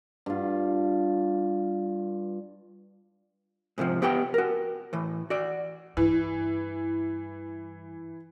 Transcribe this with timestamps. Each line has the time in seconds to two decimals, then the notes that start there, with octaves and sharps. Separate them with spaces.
0.26 G2 F4
3.78 G#2 C3 E3 F3
4.02 B3 G4 B4 F#5 G5
4.34 F#4 A#4
4.93 A2 E3
5.30 F#4 D5
5.97 G2 E3